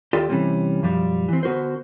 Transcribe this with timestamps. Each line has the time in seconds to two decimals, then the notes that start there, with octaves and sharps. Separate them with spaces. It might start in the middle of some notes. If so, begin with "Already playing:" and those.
0.13 D#2 F4 G4 A4 D5 G5
0.29 C3 E3 F#3 G3 C4 C#4
0.82 B1 F#2 F3 G3 D4
1.29 E3 C4
1.43 D3 B3 F#4 A#4 C5